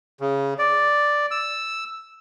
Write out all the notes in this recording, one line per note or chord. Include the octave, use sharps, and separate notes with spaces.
C#3
D5
E6